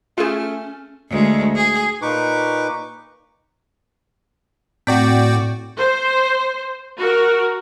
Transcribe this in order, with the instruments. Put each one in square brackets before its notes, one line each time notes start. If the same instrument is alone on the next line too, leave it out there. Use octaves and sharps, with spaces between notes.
[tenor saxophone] A3 [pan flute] C#4 [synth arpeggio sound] F4 G#4
[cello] D2 G#3
G#4
[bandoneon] A#2 D#4 B4 C#6 D6
[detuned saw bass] A2 [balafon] C4 [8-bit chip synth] F#4 D5 G5
[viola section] C5
F#4 A#4